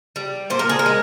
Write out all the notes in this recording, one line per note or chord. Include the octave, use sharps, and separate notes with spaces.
G3
A#2 C5
A#4
G#4
A#4
G#3